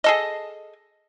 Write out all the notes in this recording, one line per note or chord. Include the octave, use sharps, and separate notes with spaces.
G#4 A4 D#5